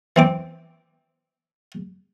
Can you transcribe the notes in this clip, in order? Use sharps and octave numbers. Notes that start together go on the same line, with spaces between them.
E3 C4 D6